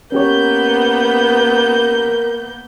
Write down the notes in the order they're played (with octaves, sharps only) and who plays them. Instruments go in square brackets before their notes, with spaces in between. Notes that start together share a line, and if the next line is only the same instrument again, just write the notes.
[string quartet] A#3 B3 G6 [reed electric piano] C#4 G4 C#5 [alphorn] A#4